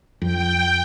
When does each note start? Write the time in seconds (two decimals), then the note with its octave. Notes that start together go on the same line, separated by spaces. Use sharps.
0.22 F2 G5